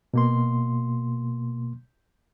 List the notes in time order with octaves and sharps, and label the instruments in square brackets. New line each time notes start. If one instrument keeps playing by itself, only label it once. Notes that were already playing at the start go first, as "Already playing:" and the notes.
[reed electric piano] B2 A#3 C6